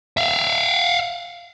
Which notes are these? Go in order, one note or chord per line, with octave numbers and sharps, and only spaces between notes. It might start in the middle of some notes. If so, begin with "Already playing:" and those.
E5 F5